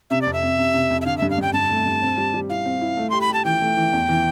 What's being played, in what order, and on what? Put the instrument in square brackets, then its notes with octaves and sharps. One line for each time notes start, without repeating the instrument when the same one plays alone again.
[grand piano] C3 [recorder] E5
[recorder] D5
[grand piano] F2
[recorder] E5
[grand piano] F2
C3
C3
F2
[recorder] E5
[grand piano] D3 [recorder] F5
[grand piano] G2 [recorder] E5
[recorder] F5
[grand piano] G2 [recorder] G5
[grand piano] G2 [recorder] A5
[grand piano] A3
G2
C4
G3
G3
[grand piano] E4 [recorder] F5
[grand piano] C4
E4
A3
[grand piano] G4 [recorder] C6
[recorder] B5
[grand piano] G4 [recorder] A5
[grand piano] E3 [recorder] G5
[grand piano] A3
E3
E2
E3